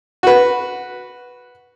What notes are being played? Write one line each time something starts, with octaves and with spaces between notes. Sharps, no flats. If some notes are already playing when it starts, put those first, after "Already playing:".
F#4 B4